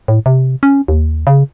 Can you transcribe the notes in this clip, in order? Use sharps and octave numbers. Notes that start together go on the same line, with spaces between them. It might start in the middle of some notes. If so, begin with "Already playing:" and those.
A2
C3
C#4
D#2
C#3